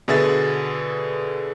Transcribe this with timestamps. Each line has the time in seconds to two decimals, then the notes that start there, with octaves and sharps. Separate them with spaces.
0.08 B2 D3 G#4 B4 E5 A6